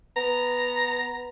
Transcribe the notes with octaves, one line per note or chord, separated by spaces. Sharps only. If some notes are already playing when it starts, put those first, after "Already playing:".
B3 A#5